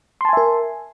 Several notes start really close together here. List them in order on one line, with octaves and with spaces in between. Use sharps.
C6 A5 G#5 E5 A#4